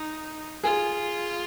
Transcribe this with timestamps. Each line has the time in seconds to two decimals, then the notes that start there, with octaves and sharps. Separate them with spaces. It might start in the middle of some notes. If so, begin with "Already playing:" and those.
Already playing: D#4
0.64 F4 G#4